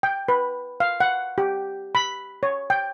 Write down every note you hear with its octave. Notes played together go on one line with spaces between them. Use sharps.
G5
B4
F5
F#5
G4
B5
C#5
G5